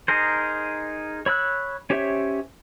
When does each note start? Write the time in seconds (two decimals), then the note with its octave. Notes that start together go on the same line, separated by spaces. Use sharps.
0.08 D#4 G#4 A#4 C5
1.26 C#5 B5 E6 F#6
1.90 C#4 G4 C5 C#5 E5